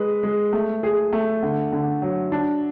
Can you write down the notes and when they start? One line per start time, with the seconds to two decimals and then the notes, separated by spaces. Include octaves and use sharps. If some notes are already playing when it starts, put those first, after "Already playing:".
Already playing: G#3 B4
0.23 G#3
0.53 A3
0.83 G#4
1.13 A3
1.42 D3
1.72 D3
2.02 F#3
2.32 D4